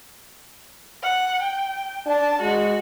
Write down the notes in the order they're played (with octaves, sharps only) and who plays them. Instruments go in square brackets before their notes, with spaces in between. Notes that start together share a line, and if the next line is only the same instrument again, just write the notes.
[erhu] F#5
G5
[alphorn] D4 [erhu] A5
[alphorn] G#3 [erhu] F#4